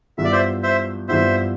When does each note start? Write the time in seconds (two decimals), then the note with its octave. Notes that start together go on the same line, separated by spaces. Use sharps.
0.18 G2 E3 B3 F4 E5
0.25 D5
0.32 C5 E5
0.63 C5 E5
1.08 G2 E3 B3 F4 C5 E5